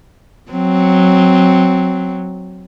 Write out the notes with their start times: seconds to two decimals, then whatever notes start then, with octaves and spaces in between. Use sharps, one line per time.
0.51 F#3 C4